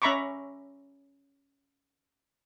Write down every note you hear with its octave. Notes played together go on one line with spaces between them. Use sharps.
C#4 E5 A#5 B5 C#6 D6